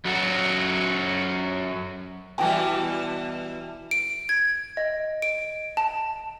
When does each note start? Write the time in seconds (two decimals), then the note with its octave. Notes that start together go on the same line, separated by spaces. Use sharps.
0.05 F#2 F#3 F#4 A4
2.38 B2 E3 G3 F#4 G5 G#5
3.91 D7
4.29 G#6
4.77 D#5
5.22 D7
5.77 A5